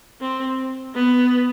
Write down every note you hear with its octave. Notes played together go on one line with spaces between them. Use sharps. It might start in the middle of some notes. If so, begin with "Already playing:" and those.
C4
B3